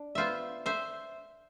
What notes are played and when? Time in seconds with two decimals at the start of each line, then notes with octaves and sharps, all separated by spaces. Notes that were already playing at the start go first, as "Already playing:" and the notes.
Already playing: D4
0.15 B3 F4 C5 E5
0.66 C5 E5